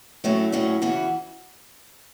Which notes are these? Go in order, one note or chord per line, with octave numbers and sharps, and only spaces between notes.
A2 F#3 A3 C#4
A2 F#3 A3 C#4
C#3 E3 B3 F#4